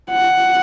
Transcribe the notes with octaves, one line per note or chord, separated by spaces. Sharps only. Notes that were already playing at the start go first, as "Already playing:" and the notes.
F#5